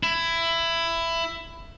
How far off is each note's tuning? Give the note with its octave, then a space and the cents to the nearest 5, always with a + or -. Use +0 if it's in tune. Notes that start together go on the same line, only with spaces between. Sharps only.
E4 +15